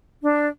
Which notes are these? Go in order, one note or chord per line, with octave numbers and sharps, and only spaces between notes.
D4